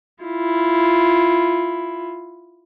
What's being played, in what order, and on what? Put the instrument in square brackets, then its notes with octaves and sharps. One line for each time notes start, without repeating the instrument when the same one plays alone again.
[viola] E4 F4